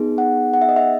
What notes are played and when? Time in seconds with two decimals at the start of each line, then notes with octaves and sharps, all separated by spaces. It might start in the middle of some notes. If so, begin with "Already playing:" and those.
Already playing: B3 D#4 G#4
0.18 F#5
0.54 F#5
0.62 E5
0.69 D#5
0.76 E5